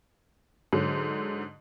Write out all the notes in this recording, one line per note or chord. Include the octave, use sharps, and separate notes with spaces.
G#2 D3 F#3